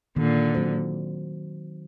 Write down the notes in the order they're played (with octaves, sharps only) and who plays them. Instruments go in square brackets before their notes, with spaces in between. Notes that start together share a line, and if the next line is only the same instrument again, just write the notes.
[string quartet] A#2 D3 [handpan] D#3
[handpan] F#3 C4 F#4 C5